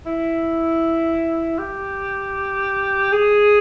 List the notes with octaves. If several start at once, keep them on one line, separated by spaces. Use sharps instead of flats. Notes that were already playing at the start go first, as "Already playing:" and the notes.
E4
G4
G#4